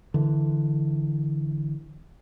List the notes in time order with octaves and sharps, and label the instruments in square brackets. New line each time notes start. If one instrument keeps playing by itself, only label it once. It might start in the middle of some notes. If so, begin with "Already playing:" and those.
[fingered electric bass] D3 E3